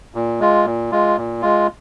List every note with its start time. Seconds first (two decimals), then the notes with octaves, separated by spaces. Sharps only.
0.15 A#2
0.40 G#3 F4
0.66 A#2
0.92 G#3 F4
1.17 A#2
1.42 G#3 F4